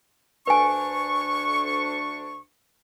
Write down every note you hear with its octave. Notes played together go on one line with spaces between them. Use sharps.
D2 D4 B4 G#5 C#6